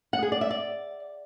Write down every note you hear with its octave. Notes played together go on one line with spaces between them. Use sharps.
F#5
G#4
D5
E5
D5